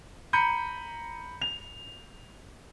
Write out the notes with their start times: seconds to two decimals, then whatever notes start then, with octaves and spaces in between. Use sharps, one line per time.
0.33 A#5 B5 G6 C#7 D#7
1.42 F7